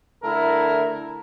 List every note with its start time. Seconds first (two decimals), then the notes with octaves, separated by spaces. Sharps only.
0.23 D3 A3 E4 A4 A#4